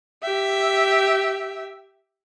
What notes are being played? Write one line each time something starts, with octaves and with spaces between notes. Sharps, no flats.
G4 E5